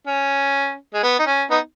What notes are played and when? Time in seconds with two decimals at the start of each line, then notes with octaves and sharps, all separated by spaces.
0.07 C#4
0.94 G#3
1.03 B3
1.19 D#4
1.27 C#4
1.50 B3 D#4